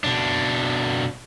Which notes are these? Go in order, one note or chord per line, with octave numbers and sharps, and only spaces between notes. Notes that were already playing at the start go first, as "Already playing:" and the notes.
B2 D4